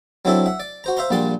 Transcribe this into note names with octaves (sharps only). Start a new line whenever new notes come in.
F#3 C4 D4 E4 A4 E5
E5 F#5
D5
F#4 C5 A#5
C5 E5 F5 A#5 C6
A#1 A#2 G3 D5 F#5 C6